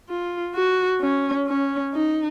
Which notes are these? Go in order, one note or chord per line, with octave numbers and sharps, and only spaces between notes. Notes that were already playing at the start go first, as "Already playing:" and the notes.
F4
F#4
C#4
C#4
D#4